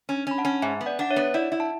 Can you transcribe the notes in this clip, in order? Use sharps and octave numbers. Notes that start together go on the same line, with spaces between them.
C#4
C#4 B5
F#5 A5
C#4
G#2 E5 G#5
B3
D5 F#5
D4 F#5
C#5 E5
B3
E4 D5 F#5
E4
A5